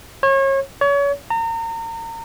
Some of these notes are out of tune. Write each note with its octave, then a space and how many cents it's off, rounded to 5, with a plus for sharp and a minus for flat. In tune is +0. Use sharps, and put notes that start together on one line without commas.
C#5 -35
C#5 +30
A#5 -35